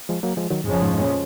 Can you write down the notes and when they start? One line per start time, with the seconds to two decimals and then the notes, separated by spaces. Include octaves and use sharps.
0.09 F3 G#3
0.23 F#3 A#3
0.37 F3 G#3
0.50 D#3 F#3
0.64 F2 G#2 C#3 F3 G#3 C#4
0.83 G#2
0.94 G#2
1.01 A#2